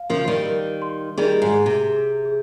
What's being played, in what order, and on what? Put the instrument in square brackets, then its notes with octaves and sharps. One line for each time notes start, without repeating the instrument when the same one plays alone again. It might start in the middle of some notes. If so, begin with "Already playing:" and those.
Already playing: [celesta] F5
[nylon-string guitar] C#3 F3 [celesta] A#4
[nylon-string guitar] D#3 G3
[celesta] A#4
C6
[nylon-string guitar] D#3 G3 [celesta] G#4
[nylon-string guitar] G#2
[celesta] G#4
[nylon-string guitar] C3
[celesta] G#4
G#4